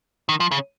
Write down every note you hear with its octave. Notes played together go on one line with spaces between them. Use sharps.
D#3
F3
C#3